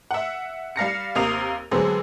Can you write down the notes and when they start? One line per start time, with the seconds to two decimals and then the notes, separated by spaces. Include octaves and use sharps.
0.11 E5 F#5
0.76 G3 F5 A#6 C#7
1.15 D#2 C3 A#4 F5 D#6 F7
1.71 D3 F#3 G#3 B3 C4 G#4